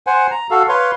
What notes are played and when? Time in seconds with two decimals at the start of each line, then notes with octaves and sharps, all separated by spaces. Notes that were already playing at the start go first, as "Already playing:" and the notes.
0.07 C5 F#5 G#5
0.31 A#5
0.51 F#4 A4 F5
0.69 B4 C#5 F5 C6